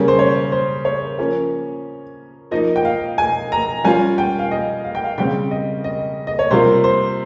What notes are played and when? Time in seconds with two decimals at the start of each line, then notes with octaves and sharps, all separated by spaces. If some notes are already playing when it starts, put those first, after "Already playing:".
Already playing: C#3 G3 A#3 C#4
0.08 C5
0.19 C#5
0.52 C5
0.85 C#5
1.19 F3 A#3 C#4
2.51 F3 A#3 D#4 D#5
2.76 G5
2.85 F5
3.18 G#5
3.52 A#5
3.84 G3 C#4 F4 G#5
4.18 G5
4.39 F5
4.51 D#5
4.84 F5
4.95 G5
5.04 F5
5.18 C#3 G3 C4 G5
5.51 D#5
5.84 D#5
6.27 D#5
6.39 C#5
6.51 C3 G3 A#3 F4 C5
6.84 C5